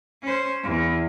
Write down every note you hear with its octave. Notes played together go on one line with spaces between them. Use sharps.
C#4 C5
E2